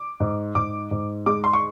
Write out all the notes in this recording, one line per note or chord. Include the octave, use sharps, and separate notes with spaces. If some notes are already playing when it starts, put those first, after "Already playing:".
Already playing: D6
G#2
G#2 D6
G#2
G#3 D6
C6
C#6